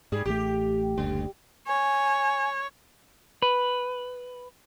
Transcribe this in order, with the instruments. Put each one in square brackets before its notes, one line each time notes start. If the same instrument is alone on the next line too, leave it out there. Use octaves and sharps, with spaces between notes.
[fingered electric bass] G#2 [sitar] G3 G#4
[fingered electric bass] A1 A3 [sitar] G4
[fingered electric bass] F#1 D2 [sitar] G3
[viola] C#5 [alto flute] G#5
[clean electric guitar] B4